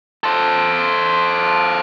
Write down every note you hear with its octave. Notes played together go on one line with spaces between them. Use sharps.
A4 C5